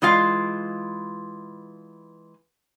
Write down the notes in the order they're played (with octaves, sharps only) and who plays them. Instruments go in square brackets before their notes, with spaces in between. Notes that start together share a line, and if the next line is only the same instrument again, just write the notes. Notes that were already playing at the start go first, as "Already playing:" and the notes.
[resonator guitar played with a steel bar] E3 G#3 F4 F5